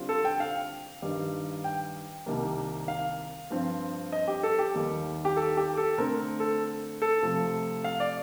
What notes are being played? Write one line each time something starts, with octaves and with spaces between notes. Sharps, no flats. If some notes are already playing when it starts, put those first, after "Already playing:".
Already playing: D3 G3 C4 F4
A4
G5
F5
G2 D#3 G3
G5
C2 C3 D#3 G3 A#3
F5
G2 F3 C4 F4
D#5
G4
A4
G4
D#2 D#3 G3
G4
A4
G4
A4
D3 A3 C4 A#4
A4
A4
C3 F3 A3
F5
D5